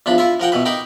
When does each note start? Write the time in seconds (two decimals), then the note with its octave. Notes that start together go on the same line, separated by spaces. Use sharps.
0.06 E2 F3 D4 B5
0.18 E4 F4 E5
0.40 F3 A#4 F#5 G5
0.52 B2 E3 B4
0.65 D#4 A#4 G5 B5 D6